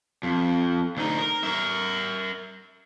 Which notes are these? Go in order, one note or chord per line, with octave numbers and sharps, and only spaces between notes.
F2
D2 D#4
A#4
A#4 E5